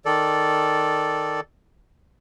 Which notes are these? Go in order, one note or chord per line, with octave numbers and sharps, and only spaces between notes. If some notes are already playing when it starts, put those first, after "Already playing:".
D#3 A4 D5